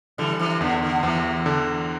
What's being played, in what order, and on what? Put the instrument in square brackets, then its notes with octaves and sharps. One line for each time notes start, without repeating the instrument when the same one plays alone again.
[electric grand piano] D3 [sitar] E3 G3
[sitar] C3 E3
[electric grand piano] E2 [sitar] D3
[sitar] D3
[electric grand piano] E2 [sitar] C3 E3
[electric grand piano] D3